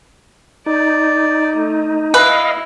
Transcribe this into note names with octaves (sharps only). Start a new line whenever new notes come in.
D#4 D5
A3
E4 B4 D#5 F5